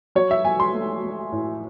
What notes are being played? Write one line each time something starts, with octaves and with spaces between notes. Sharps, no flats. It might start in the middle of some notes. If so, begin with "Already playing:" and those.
F#3 C#5
E5
F#3 G#5
C6
A3
A3
A2